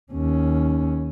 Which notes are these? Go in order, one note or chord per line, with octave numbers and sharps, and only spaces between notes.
D#2 C#4